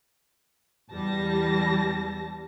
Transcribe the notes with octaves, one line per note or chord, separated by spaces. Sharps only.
E2 G3 A5 A#6